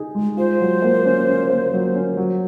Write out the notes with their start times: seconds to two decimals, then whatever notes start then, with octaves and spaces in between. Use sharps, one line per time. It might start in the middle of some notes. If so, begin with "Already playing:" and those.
Already playing: D#4 G#4
0.15 G#3
0.37 F4 C5
0.60 F#3
0.82 A#3
1.05 C#4
1.28 C#4
1.50 A#3
1.73 F#3
1.95 C#4
2.17 F#3